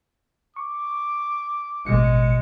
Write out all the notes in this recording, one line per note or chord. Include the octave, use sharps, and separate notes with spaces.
C#6 D6
A1 B2 G#3 C#7